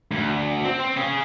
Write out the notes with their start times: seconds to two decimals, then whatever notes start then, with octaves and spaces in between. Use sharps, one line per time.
0.11 D2
0.64 C4
0.80 C4
0.96 C#4 G#4